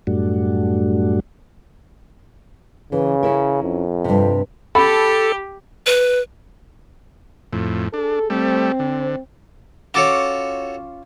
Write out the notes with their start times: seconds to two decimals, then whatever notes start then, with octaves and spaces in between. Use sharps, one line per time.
0.07 F#2 A2 G3 A3 D4 F#4
2.92 C#3 E3
3.23 C#4 E4 A#4
3.63 F2
4.04 G2 C3
4.75 G4 A4 B5
5.86 B4
7.53 F2 A2
7.94 D4 G#4 A4
8.30 G3 A3 C4
8.79 D3
9.94 C#4 F4 F#4 A4 C#5 D6